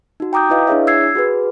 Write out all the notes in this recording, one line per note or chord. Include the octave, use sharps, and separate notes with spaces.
D#4 F#4
G5 A#5 D6 D#6 G6
E4 B4 D#5 F5
D4 E4 G#4 C#5 E5
E6 G#6 C7
F#4 G#4 B4